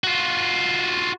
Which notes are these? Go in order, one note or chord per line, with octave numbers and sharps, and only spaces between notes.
F4 F#4